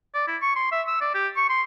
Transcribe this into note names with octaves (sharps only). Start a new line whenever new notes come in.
D5
E4
C#6
C6
E5
E6
D5
G4
C#6
C6